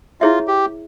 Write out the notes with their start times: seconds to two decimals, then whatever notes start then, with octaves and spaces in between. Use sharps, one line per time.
0.21 E4 F4 G#4 C#5 E5
0.47 G4